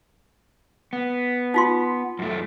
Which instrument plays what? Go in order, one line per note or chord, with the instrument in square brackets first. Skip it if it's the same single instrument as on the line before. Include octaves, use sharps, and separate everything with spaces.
[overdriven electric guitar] B3
[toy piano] D#4 F4 C6
[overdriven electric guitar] F#2 A3